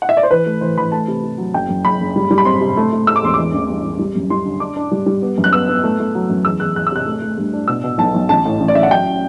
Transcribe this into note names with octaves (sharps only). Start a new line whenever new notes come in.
F#5
E5
D5
C5
E3 B4
A3
E3 C5
E3 B5
A3 A5
C3
C3
F#3
F#1 G5
F#2
F#1 B5
F#1
G3
G3
B5
C4 C6
C3
A3
A3
A3 E6
D6
E1 C6
E3 D6
A1
G2
A1
G3
F#2
G3 C6
D3
D4 D6
D4
G3
G3
B3
F#2
F#6
B3 E6
B3
A3
A3
F#3
F#2
E2 E6
E2 F#6
E2 F#6
E6
C3 F#6
A3
A3
G2
D4
B2 E6
B2
B1 A5
B1
A1 A5
A2
A1
D5
A1 E5
F#5
F#3 G5